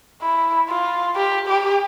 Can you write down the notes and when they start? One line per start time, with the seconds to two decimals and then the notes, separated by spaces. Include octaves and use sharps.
0.22 E4
0.69 F4
1.16 G4
1.48 G4